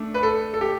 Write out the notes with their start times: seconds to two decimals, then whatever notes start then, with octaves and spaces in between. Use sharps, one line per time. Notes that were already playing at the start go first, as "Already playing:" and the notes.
Already playing: A3 D4
0.14 B4
0.23 A4
0.54 A4
0.61 G4